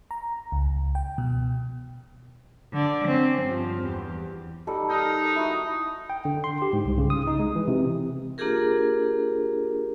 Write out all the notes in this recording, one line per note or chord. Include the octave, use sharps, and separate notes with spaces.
A#5
C#2
G5
B2
D3 D5
C4 C#4
G2 F3
E2 G4
G3 D#4 A4
D#4 A#4
E4 F#4
G5
D3
C6
G4
G#2
C2
C#3
D#6
D#4
G#3
E3
C3
A#3 D4 F4 G4 G#4 A#4